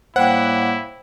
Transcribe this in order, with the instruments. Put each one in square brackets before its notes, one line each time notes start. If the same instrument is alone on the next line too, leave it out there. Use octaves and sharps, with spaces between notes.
[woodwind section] A2 G3 A#3 [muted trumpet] E4 [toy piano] C5 G5 [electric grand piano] F#5